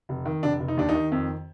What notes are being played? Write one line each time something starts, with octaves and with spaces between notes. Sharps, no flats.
F1
D#3
F1 D4
F1
D#4
D#2 D4
D#4
D#3
F2